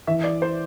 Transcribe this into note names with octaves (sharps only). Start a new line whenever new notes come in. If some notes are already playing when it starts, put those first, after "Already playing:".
E3 E5
D5
C5